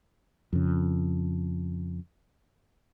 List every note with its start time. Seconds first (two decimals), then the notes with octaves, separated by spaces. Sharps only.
0.53 F2 C#3